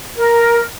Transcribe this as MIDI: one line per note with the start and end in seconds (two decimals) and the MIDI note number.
0.16 0.62 70